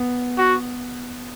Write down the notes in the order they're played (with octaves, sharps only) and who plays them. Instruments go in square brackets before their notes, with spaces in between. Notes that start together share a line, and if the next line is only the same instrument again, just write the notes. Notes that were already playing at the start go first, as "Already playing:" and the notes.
Already playing: [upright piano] B3
[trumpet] F#4